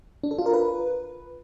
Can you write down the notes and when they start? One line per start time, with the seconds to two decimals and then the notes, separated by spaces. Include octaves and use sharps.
0.24 D4
0.31 A4
0.39 F4
0.46 A#4
0.54 B4